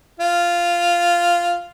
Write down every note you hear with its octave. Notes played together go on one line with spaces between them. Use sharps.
F4